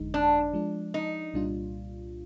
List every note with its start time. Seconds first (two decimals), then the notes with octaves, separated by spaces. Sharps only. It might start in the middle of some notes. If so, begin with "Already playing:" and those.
Already playing: G1 F2 D3 G#3 D#4
0.14 D4
0.53 F3 G#3 D4
0.94 D#4
1.34 C2 A#2 G3 D4 F4